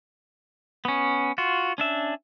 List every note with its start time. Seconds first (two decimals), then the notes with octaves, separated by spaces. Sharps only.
0.85 B3 C#4
1.38 F4 F#4
1.78 C#4 D4 E5